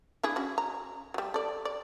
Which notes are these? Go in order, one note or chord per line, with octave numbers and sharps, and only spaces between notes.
D4 E4 G#4
C#4 F#4
A#5
F#3 G3
A4 D5
D5